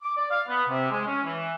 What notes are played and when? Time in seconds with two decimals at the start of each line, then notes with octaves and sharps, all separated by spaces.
0.03 D6
0.16 D5
0.31 F5
0.48 B3
0.69 C3
0.90 G#3
1.06 C#4
1.24 E3